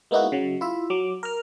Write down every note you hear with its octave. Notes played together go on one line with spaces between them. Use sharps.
G#3 A#3 B3 D#4 E4 F#4
C#3 F#3
E4 F4 E5
F#3 D6
A#4 F6